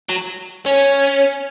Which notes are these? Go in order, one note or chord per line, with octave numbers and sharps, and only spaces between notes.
F#3
C#4